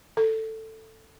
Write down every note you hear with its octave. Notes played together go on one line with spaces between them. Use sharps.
A4